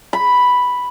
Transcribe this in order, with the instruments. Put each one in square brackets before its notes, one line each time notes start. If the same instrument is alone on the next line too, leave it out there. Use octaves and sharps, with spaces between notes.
[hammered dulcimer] B5